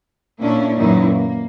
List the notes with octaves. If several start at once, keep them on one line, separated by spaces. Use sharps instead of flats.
A#2 A#3 C#4 D4 E4
F#2 A#2 D#3 E3 D#4 E4
A#3